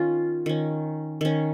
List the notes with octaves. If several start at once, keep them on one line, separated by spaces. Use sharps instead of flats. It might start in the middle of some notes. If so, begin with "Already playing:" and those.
Already playing: D#3 C#4 F4
D#3 C#4
D#3 C#4